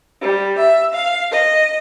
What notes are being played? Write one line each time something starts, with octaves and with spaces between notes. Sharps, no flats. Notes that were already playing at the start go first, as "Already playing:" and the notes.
G3
E5
F5
D#5